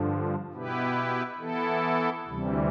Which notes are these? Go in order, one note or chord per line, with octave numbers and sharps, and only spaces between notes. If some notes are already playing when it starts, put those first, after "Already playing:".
Already playing: G2 D3 F3
B2 B3 E4 G4 B4
E3 B3 E4 A4
D2 C3 E3 G3